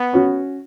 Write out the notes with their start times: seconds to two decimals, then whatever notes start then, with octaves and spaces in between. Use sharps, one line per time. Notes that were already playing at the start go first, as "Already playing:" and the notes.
Already playing: B3
0.13 C#4 F#4